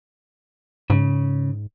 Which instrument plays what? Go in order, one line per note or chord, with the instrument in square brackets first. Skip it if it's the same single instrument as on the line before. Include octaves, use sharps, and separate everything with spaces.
[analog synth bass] G#2 [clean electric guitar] C#3